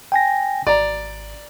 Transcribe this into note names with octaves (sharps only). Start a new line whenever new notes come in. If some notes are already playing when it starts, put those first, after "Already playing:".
G5 G#5 A#6
G#1 D5 A#5